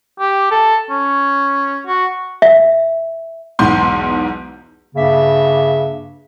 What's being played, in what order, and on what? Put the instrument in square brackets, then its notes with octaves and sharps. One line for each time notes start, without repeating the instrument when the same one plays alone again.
[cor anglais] G4
A4
C#4
F#4
[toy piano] E5
[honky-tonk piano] B1 E2 G#2 B3 C6 G6
[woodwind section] G2 C#3 A#3 E5